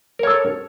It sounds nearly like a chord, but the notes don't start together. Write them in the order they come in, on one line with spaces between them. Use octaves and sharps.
A#4 C#5 A4